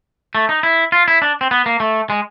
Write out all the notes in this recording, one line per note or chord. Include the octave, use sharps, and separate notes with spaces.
A3
D#4
E4
F4
E4
D4
C4
B3
A#3
A3
G#3